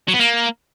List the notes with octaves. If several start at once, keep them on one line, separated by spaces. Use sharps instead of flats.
F#3
B3
A#3